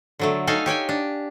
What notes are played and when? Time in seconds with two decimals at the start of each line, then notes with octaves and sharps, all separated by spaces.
0.19 D3 F#3 A3
0.47 D#4 A4 F5 G#5
0.66 G4 C#5 G5 G#5
0.89 D4